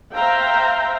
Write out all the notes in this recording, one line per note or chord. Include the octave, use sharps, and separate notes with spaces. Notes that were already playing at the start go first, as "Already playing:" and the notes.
C5 E5 F5 G5 A#5